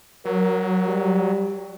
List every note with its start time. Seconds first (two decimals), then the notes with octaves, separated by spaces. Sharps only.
0.25 F#3 A#4
0.86 G3